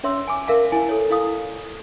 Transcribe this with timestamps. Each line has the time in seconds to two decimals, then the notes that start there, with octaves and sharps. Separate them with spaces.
0.04 C#4 C#5 E5 C6 E6
0.27 G#5 A5 D6
0.47 A#4 E5 F5 A5
0.72 E4 G#5 A5
0.89 A4 C#5
1.10 E4 F5 D#6